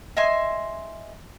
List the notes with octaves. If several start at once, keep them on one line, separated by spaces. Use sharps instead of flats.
D#5 E5 G#5 C6